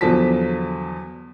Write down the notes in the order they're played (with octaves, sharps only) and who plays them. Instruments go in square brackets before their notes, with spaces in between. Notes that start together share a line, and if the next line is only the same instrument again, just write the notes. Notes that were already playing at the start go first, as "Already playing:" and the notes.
[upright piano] E2 D3 F3 F#3 A5 B6